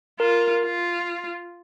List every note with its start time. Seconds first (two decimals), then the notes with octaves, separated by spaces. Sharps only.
0.20 F4 A#4
0.65 F4